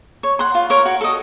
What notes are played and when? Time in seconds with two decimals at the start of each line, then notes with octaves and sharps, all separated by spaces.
0.23 C#5
0.39 F#5 C6
0.55 F4
0.70 A#4 C#5
0.85 F#4
1.01 A4 D#5